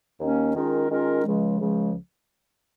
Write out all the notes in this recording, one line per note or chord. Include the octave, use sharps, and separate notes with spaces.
D#2 D#3 A#3 C#4
D#3 G#3 C#4 F4 A#4
D#3 G#3 C#4 F4 A#4
C#2 C#3 F3 G#3
C#2 C#3 F3 G#3